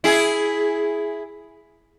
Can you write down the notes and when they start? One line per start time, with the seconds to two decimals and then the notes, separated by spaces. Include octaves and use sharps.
0.04 E4 G#4